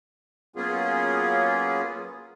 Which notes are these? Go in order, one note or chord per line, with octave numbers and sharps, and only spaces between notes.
F#3 A#3 B3 C#4 F4 G#4